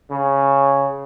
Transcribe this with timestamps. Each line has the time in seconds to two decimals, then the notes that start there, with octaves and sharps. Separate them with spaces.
0.11 C#3